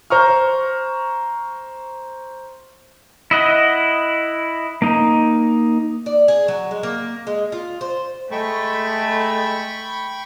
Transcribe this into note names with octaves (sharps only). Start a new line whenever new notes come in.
C5 A#5 C#6 F6
E4 D#5 F#5
A#3 D#4
D5
G#4
F#3
G#3
A#3
G#3
F4
C5
G#3 A3 A4 G5 B5 C#6